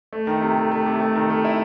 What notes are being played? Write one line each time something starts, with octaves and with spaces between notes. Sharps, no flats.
A3
D#3
C3
A3
A3
C3
A3
D#3
A3
E4